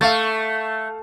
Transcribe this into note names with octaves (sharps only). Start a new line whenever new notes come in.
A3 F5 C#6 A6